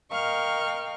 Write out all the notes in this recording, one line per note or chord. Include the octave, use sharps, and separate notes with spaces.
A#4 D#5 F5 G5 C#6 F6